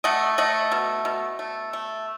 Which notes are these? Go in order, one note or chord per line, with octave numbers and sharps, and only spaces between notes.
A3 D#5 F#5
A3 D#5 F#5
B2
B2
A3
A3